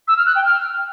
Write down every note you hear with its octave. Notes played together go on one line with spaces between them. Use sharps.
E6
F6
F#6
G5
F6